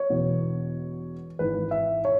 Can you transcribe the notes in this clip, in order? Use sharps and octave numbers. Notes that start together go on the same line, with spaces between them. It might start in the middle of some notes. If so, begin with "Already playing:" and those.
Already playing: C#5
E1 E2 B2 B3
G#1 G#2 E3 B4
E5
C#5